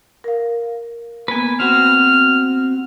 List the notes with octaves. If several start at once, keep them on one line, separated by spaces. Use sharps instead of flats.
A#4 F5
A#3 B3 B4 G#5
C4 F#4 F6